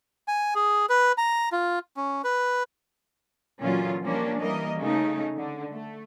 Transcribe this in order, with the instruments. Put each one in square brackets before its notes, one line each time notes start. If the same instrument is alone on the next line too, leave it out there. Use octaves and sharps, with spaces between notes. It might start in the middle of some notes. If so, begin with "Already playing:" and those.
[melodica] G#5
G#4
B4
A#5
F4
C#4
B4
[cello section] A#2 D3 E3 F#3 C#4 F4
F3 G3 A#3 C#4 D4
E3 G3 A#3 A#4 D#5
C#3 A3 D#4
D3
A3